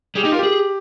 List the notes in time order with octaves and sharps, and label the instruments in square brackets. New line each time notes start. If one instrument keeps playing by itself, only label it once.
[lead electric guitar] G3 [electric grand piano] G#4
[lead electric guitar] D#4 [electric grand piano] G4
[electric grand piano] F4 [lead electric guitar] A#4
[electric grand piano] G4 [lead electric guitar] G#4